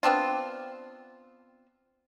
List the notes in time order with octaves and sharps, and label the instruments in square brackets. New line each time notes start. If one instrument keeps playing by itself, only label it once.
[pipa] B3 C4 D4 F4